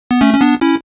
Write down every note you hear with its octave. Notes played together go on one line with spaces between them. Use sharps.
B3
A3 C#4
C#4
B3 D4
C#4 E4